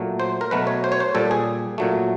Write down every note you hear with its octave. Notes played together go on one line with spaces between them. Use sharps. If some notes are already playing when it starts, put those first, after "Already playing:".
Already playing: A#2 F#3 A3
C5
A#4
B2 F#3 A3 B4
C#5
C5
C#5
C5
A#2 G3 A4
G#4
A#2 F#3 A3